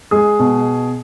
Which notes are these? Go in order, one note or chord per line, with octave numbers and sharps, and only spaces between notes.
G#3 G#4
B2